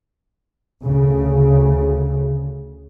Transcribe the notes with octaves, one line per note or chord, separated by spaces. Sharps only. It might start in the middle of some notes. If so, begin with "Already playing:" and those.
D2 C#3